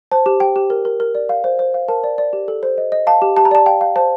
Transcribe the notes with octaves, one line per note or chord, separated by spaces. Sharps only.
C5 A5
G4
G4 G5
G4
A#4
A#4
A#4
D5
F5
C5
C5
F5
A#4 A5
D5
D5
G4
A4
C5
D#5
D#5
F5 A5
G4
G4 A5
A#5
D5 A5
F5 G5
F5
C5 A5